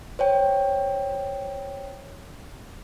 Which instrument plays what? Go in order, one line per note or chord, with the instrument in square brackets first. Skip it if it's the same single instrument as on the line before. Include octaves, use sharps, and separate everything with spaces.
[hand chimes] C5 C#5 G5